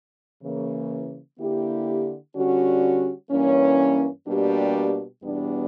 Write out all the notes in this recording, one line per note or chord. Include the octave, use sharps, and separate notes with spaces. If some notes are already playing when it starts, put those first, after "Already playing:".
C#3 E3 A#3
D3 A#3 E4 G4
D3 G3 C#4 F#4
G2 E3 A#3 C#4
B2 G3 A#3 D4 G4
E2 B2 G3 B3 D4